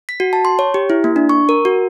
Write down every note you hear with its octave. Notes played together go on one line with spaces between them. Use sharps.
B6
F#4
A5
C6
C#5
G4
E4
A#3
D4
C#6
A#4
F#4